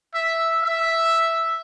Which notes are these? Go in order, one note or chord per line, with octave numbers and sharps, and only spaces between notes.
E5
E5